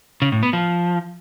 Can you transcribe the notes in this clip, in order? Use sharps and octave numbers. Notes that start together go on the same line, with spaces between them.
C#3
A2
B3
F3